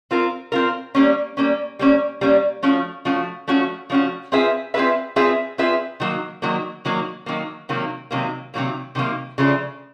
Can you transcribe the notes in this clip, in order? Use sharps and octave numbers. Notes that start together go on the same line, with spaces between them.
C4 F4 A#4
C4 F4 A#4
G3 A#3 C#4
G3 A#3 C#4
G3 A#3 C#4
G3 A#3 C#4
F3 A3 C#4 F#4
F3 A3 C#4 F#4
F3 A3 C#4 F#4
F3 A3 C#4 F#4
C4 F4 G#4 B4 E5
C4 F4 G#4 B4 E5
C4 F4 G#4 B4 E5
C4 F4 G#4 B4 E5
D#3 F#3 A#3
D#3 F#3 A#3
D#3 F#3 A#3
D#3 F#3 A#3
C3 D#3 F#3 A#3
C3 D#3 F#3 A#3
C3 D#3 F#3 A#3
C3 D#3 F#3 A#3
C#3 F3 A3 D4